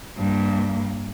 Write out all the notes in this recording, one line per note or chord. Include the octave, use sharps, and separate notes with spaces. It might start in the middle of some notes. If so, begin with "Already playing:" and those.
G2 A#3